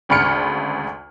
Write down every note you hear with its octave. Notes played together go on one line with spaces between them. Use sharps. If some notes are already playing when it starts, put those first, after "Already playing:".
G#1 D2 C#3 B5 F6 C#7